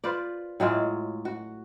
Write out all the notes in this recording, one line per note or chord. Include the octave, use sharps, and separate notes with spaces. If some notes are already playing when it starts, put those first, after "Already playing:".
F4 B4 C5 D5
A2 F#3 G#3 F4
F#4